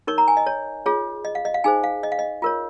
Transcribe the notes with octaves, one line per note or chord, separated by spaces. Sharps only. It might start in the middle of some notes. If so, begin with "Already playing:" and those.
D#4 A#4 C#5 C#6
A#5
G#5
D#5
C#5
F4 G#4 C#5
D#5
F5
D#5
F5
D#4 G#4 C5 G#5
F5
D#5
F5
D#5
F4 A#4 C#5